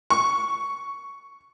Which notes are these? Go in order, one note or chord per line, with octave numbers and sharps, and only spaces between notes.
C#6